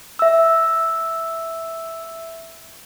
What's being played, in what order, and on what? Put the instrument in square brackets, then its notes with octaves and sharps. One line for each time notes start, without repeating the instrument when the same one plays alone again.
[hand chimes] E5 E6